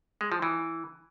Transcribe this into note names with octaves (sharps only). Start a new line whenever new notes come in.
G#3
F3
E3